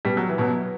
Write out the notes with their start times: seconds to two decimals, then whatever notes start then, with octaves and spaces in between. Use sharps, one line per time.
0.05 B2 G3
0.17 F#3
0.29 E3
0.38 B2 F#3